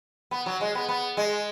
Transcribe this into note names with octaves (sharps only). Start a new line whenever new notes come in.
B3
F#3
G#3
B3
B3
G#3